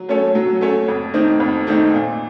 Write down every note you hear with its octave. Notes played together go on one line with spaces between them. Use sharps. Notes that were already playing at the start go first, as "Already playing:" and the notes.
Already playing: F#3
A3 C#4 A4 C#5
F#3
A3 C#4 A4 C#5
F2
D#3 A3 C4 D#4
F2
D#3 A3 C4 D#4
A#2